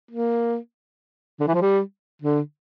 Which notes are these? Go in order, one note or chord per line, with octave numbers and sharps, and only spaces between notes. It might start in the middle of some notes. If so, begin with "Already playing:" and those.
A#3
D3
E3
F3
G3
D3